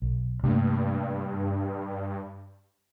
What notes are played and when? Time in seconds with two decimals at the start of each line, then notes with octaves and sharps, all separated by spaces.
0.02 B1
0.43 G2 C3 A3 A#3